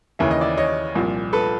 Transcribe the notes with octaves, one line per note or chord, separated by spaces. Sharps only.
D#2 C#3 E3 E5
D#5
D5 E5
C#5 D#5
C2 A#2 F3
A4 B4